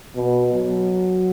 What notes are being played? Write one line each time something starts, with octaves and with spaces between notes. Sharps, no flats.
B2
F#3